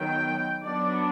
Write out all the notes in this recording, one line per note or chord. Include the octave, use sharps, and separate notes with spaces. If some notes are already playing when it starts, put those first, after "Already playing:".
Already playing: D#3 F#3 B3 G5
F#3 B3 D4 D5